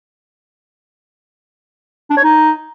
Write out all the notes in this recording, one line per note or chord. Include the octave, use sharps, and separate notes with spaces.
D4
C#5
D#4